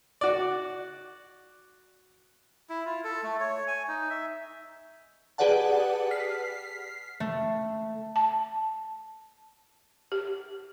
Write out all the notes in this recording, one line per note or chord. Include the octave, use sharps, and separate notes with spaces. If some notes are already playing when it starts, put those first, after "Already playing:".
F#4 D5
E4
F4
A4
A3
C#5
G#5
D#4
E5
G4 G#4 B4 D5 F#5 A5
F6 B6 C7
A3
A5
G4